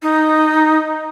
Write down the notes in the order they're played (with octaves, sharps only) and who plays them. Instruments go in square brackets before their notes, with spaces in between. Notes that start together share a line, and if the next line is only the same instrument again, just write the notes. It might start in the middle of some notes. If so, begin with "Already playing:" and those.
[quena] D#4